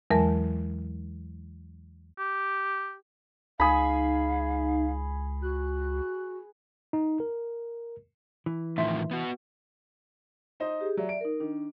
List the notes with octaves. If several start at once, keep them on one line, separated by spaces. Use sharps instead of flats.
E2 E3 F#3 G#3 A#4 A5
G4
C#2 D#4 G#4 F5 B5
F#4 F#6
D#4
A#4
E3
A2 D#3 F3 E5 C6
B3 F#4
D#4 C5 D#5
G4 G#4
F#3 D5 E5
D7
D#4 A#4
D#3 D4